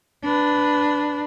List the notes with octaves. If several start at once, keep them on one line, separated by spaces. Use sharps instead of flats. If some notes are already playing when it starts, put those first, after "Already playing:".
D4 B4